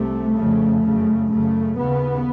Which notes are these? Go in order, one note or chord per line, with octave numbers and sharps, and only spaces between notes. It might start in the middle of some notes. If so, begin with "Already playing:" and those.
Already playing: C2 C3 A3
F2 C#3
F#2 C#3
F#2 C#3 A3
D#2 C#3 B3